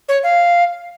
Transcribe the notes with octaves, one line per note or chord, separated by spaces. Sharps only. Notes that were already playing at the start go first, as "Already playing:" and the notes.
C#5
F5